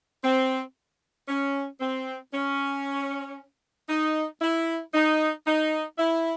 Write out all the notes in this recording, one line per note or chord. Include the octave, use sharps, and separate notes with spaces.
C4
C#4
C4
C#4
D#4
E4
D#4
D#4
E4